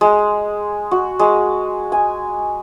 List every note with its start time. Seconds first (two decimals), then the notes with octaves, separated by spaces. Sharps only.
0.01 G#3
0.91 F#4
1.19 G#3
1.92 G#5